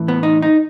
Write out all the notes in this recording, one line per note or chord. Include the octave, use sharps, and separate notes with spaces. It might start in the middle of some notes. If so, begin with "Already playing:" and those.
Already playing: A2 E3
B3
D#4
D#4